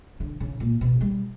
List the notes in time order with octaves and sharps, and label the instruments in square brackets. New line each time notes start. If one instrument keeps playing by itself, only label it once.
[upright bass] D3
C#3
A#2
B2
G3